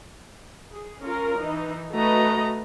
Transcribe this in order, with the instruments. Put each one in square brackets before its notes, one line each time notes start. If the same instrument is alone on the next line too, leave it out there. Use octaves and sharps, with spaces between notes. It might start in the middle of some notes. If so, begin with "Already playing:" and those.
[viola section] G#4
C#4 F4 A#4
E3 D#4
[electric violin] A3 A#5 [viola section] F#4 B4 D#5